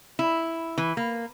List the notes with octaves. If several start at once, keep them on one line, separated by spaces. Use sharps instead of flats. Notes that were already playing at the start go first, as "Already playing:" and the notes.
E4
E3
A#3